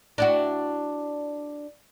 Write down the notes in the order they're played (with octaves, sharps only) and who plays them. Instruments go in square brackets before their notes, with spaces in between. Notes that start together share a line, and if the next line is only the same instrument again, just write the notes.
[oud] D4 E4 F#4